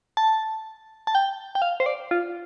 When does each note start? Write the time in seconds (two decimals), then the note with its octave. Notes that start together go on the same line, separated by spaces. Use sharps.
0.17 A5
1.07 A5
1.15 G5
1.55 G5
1.62 F5
1.80 C5
1.86 D5
2.11 F4